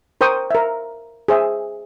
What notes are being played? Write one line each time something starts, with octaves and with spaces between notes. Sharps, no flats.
A#4 C5 G5 C#6 D#6
A#4 E5
G#4 C5 E5